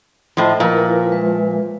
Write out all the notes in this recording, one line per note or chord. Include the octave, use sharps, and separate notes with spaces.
A2 F3 C5 D#5 E5
A#2 F3 E4 A#4 B4
G#3 B4 E5